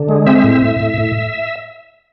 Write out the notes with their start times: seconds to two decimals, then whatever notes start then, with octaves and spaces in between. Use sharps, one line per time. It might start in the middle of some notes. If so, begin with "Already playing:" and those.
Already playing: D3
0.09 G#3
0.26 C4 E5
0.44 A2
0.62 A2
0.80 A2
0.98 A2